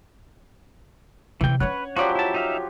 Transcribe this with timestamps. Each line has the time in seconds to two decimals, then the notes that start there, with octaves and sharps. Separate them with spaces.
1.41 C3 E3 F#3 G5
1.60 C#4 D4 B4 C#5 F#5
1.96 F3 F#3 F#4 G4 D5
2.15 E4 A5
2.34 D#4 E5 F5